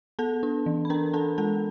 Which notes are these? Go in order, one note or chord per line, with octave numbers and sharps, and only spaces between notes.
B3 A4 A5
D4
E3
B5
D4 A#4 A#5
D4 A4 A5
G#3 A4 A5